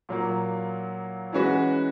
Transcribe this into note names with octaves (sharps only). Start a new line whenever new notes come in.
A#2 F#3 A#3
E3 G#3 C#4 F#4 B4